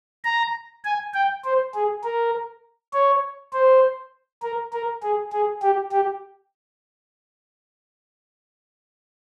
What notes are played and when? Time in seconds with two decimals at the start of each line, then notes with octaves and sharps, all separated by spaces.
0.24 A#5
0.85 G#5
1.14 G5
1.44 C5
1.74 G#4
2.04 A#4
2.94 C#5
3.53 C5
4.43 A#4
4.73 A#4
5.03 G#4
5.32 G#4
5.62 G4
5.92 G4